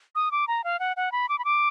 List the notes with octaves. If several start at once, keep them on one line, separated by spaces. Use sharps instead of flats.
D#6
D6
A#5
F5
F#5
F#5
B5
D6
B5
D6